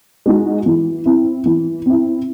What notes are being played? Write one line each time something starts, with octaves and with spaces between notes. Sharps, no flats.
G#3 D#4 F#4
E3
C4 E4
E3
C4 E4